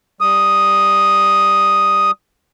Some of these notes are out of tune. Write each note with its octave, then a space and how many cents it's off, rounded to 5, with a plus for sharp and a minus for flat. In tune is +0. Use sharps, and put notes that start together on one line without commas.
G3 +0 D#6 +0